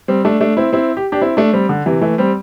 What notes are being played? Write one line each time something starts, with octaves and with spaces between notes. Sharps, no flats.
G3 C4
A3 D4
A3 D4
C4 E4
C4 E4
G4
D4 G4
C4 E4
A3 D4
G3 C4
D3
C3 E3
E3 A3
G3 C4